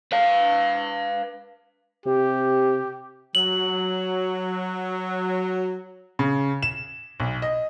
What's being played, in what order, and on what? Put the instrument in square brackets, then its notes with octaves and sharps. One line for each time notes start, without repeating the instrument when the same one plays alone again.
[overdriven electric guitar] B4 F5
[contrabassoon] C3 [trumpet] G4
[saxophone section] F#3 [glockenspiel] F#7
[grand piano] C#3
E7
B1
D#5